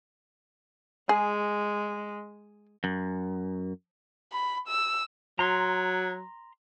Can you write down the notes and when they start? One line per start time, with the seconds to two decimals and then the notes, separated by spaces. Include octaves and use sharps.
1.09 G#3 G#4
2.84 F#2
4.32 B5
4.68 E6
5.39 F#3 A#5 C6